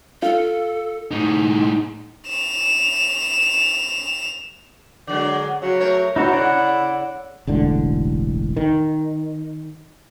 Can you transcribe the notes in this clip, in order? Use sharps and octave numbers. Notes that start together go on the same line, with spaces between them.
F4 A4
A2 D#4
E7 F7
D3 F#3 G#3 D5
C#3 F#3
A3 A#4 C#5
B2 D#4 E4 F#4 C#5
C#3 D5 F#5
E1 A1 D3
D#3